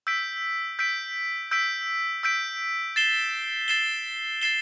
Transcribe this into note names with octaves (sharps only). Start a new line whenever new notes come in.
E6 G6 B6 D7
E6 G6 B6 D7
E6 G6 B6 D7
E6 G6 B6 D7
A6 C7 E7 G7
A6 C7 E7 G7
A6 C7 E7 G7